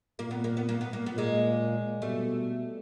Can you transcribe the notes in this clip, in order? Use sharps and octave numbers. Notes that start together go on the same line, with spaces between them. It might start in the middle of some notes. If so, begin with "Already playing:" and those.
A#2 A#3
B3
A#3
B3
A#3
B3
A#3
A#2 B3
G#3 A#3
B2 G3 A3